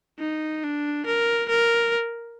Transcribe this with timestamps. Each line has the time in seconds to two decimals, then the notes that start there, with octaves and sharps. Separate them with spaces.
0.19 D#4
0.63 D4
1.06 A#4
1.49 A#4